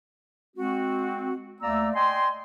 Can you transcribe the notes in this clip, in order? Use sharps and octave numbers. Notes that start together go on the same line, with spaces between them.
G#3 C4 F#4
D2 A3 A#3 D5 A#5 E6
D5 D#5 G5 G#5 C6